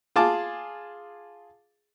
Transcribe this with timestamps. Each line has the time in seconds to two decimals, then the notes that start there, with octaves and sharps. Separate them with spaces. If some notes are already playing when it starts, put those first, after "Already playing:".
0.16 F4 G#4 A5 D6